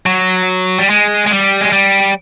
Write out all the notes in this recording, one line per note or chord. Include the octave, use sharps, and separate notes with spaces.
F#3
G3
G#3
G#3
G3
G#3
G3